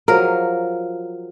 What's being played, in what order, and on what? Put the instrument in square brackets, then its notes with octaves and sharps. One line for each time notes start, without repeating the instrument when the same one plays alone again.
[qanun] F3 F#3 G#4 [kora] A#4